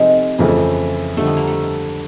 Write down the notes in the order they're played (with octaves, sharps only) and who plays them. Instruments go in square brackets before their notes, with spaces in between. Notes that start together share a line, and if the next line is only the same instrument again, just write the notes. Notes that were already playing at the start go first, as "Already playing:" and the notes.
Already playing: [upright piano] C3 F3 A3 C4 D#4 [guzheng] G#3
[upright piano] F2 C#3 E3 A3
[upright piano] F2 D3 G3 [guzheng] A3
[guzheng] B3
A#3
A3